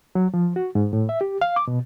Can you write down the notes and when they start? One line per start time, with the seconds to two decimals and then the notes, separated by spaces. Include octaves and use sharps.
0.15 F#3
0.34 F3
0.56 F#4
0.75 G#2
0.93 A2
1.09 E5
1.21 G4
1.41 F5
1.56 D6
1.68 B2